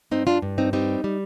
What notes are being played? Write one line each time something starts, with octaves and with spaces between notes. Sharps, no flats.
G2 C4 D#4
D4 F4
G2
C4 D#4
G3 C4 D#4
G3